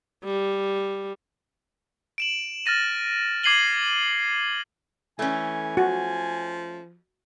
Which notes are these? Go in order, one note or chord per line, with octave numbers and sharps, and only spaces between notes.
G3
D7 E7 F#7
F6 A6 A#6 D#7
D6 G#6 C7 D#7 F#7 G7
E3 A3 C#4 G#5
F3 F#4